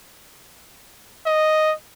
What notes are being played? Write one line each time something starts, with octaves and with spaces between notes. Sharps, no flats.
D#5